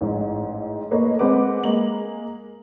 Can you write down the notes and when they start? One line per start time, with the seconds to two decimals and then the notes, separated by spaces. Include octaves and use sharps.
0.01 A1 G#2
0.91 A3 A#3 B4 C#5 D#5
1.19 G#3 C4 B4 F#5 D6
1.64 G#3 A#3 F#7